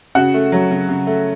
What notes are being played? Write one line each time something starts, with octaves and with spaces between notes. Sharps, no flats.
C#3 F#4 F#5
A3
F#3
C#3
C#3
A3